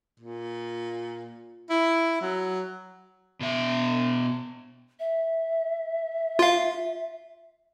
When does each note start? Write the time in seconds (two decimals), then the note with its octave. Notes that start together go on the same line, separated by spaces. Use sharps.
0.20 A#2
1.70 E4
2.22 F#3
3.41 B2 E5
5.00 E5
6.39 F4 F5